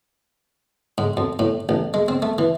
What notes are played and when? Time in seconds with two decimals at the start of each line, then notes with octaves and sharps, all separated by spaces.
0.98 G#2
1.17 F2
1.39 A2
1.69 A1
1.94 G#3
2.08 C4
2.22 A3
2.38 E3